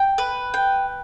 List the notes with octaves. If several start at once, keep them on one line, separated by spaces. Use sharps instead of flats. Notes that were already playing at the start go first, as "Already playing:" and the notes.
Already playing: G5
B4
G5